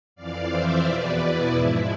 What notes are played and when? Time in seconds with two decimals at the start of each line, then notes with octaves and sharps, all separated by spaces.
0.16 F2 E3 D5 F5
0.50 C5 E5
0.85 E2 B2 B4 D5
1.19 E4
1.53 G#2 F3